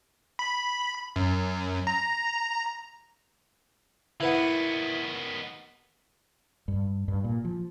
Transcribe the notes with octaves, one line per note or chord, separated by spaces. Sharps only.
B5
F#2
A#5
D#3 B3 E4 B4 F#5
G2
G2
A#2
F3